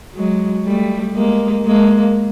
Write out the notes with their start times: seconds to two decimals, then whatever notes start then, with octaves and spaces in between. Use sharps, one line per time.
0.15 F#3 G#3
0.65 G3 A3
1.15 G#3 A#3
1.65 G#3 A#3